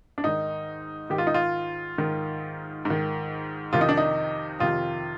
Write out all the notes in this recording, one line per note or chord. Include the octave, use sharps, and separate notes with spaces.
D4
G#2 D#3 D#4
G#2 D#3 G4
F4
D#4
F4
G#2 D#3
G#2
D#3
F2 C3 D#3 F4
D#4
D4
D#4
F2 C3 D#3 F4